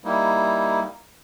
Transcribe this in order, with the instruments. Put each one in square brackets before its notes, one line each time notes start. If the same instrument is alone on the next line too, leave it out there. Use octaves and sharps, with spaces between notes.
[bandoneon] G3 A#3 D#4 E4